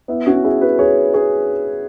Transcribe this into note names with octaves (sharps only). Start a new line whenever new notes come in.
B3 E4
C#4 F#4
E4 G#4
F#4 B4
G#4 C#5
G#4 C#5